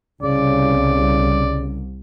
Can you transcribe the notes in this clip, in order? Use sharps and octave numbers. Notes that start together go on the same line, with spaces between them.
C2 C#3 D5